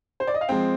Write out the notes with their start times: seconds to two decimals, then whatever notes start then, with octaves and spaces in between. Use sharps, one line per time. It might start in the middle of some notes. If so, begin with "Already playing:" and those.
0.20 C5
0.27 D5
0.34 D#5
0.41 F5
0.49 F3 G#3 C4 G5